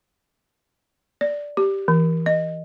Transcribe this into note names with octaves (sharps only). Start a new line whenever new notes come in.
D5
G4
E3
D#5